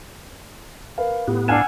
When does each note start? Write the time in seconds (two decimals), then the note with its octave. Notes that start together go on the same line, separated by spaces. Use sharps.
0.98 A#4 B4 F5
1.28 A2 B3 G4
1.48 D4 F5 F#5 G#5 A5 E6 F6 E7